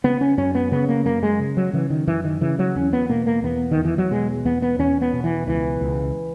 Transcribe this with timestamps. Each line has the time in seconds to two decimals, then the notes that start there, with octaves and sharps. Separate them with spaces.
0.04 C#3 B3
0.21 C#4
0.38 F#2 C#4
0.55 B3
0.71 C#3 B3
0.88 A#3
1.05 F#2 A#3
1.23 G#3
1.39 C#3
1.57 F#3
1.73 C#3 E3
1.90 D#3
2.07 F#2 E3
2.24 D#3
2.41 C#3 E3
2.59 F#3
2.76 E2 C#4
2.93 B3
3.09 B2 A#3
3.26 A#3
3.43 E2 B3
3.71 D#3
3.78 E2
3.85 E3
3.98 F#3
4.11 B2 G#3
4.45 E2 B3
4.62 B3
4.79 E2 C#4
5.01 B3
5.13 B2
5.24 E3
5.47 C#2 E3
5.81 C#2